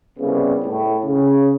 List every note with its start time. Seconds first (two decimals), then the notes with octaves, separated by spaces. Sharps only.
0.19 C2 C#3 B3
0.65 A2
1.05 C#3